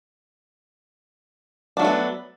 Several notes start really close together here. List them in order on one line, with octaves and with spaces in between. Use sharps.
D4 F#3 A3 B3